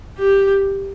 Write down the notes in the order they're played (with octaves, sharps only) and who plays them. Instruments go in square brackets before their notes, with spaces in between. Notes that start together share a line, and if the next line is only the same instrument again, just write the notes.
[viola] G4